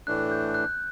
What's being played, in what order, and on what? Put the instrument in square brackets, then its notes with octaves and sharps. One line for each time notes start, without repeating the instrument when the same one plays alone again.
[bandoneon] A2 E3 A3 D4 [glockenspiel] F#6
[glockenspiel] G6
F#6